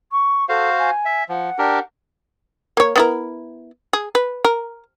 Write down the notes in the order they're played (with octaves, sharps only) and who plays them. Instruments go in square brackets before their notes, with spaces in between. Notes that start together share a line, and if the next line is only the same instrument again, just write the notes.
[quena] C#6
[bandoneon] F#4 C5 F5 [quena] A4
[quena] G#5
[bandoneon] E5
[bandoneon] F3 [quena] F#5
[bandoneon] D4 G4 A#4
[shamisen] A#3 C#5
B3 E4 A#4
G#4
B4
A#4